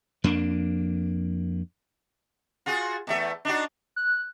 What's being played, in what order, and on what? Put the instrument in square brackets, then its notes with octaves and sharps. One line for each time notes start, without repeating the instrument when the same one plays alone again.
[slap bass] F2 A#3 D4
[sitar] F4 F#4 G#4
E2 A3 E5
D4 D#4 F#4
[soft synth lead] F#6